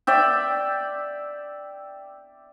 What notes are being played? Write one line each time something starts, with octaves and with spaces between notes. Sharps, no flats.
D5 E5 G5